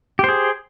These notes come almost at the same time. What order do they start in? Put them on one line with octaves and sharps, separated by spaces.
G4 C5 G#4